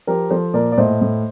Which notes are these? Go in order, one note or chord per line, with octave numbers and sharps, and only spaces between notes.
F3 G4 A#4
F3 A4 C5
A#2 A#4 D5
D5
A2 C5 D#5
A2